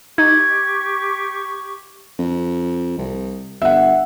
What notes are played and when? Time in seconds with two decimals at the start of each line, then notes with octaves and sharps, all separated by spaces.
0.18 D#4 G4 C#6 G#6
2.19 F2
2.98 C2
3.62 G1 E5 F#5